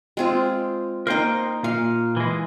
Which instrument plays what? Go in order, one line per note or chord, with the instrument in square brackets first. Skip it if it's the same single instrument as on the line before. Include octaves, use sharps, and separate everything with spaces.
[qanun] G#3 C4 F4
[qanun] A#3 D#4 [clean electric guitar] A#4 C5 G5
[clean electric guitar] A#2 [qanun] F5
[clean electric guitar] E3 G#3